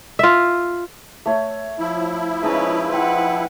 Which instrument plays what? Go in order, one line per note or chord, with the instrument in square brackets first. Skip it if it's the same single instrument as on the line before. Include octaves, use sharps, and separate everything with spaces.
[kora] F4 E5
[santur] A3 C#5
[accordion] F3 E4
[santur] G#3 D#4 A5 [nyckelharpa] C#4 B4
[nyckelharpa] B4 F#5 [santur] C5 G5